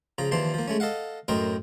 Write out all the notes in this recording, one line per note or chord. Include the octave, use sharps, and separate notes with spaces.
C#3 F3 A#5
D#2 E3 F3 D4 C6
F3 A#3
G#3 A3 C#4
A4 D#5 F5 F#5
F#2 A2 A#4 C5 D#5 G5